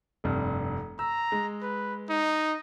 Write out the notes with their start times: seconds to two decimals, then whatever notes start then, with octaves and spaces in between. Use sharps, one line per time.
0.24 F1 G2 C3
0.99 A#5 E6
1.32 G#3
1.62 B4
2.10 D#4